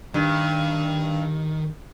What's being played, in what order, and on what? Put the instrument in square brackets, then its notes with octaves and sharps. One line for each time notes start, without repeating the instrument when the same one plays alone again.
[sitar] G2 [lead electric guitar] D#3